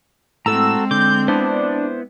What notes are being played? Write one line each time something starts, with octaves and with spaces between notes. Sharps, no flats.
A2 G#3 C4 F#4 A4 A#5 E6
D3 D6 G6
B3 D4 E4 C5